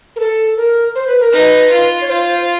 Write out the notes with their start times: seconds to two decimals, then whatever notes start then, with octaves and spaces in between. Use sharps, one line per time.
0.16 A#4
0.20 A4
0.57 A#4
0.95 C5
1.07 B4
1.20 A#4
1.31 D#4 B4
1.71 F4
2.01 C#5
2.08 F4 C5